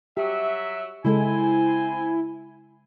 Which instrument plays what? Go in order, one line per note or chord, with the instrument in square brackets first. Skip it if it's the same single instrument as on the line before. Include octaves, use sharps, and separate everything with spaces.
[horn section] F#3 E5 [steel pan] G4
[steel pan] C#3 G#3 A4 [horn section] C4 C5 G#5 [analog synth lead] E4